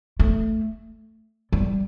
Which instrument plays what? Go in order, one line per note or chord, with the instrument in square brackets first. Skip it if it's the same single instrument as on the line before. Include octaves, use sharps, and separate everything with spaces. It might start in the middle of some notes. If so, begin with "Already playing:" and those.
[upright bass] A3
G3